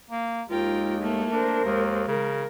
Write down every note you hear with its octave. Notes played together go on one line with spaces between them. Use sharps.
A#3
D#2 G#3 D#4 F4 A#4 G5
A3 A#3
D4 A#4 C5
D#2 G#3
C#3 A#4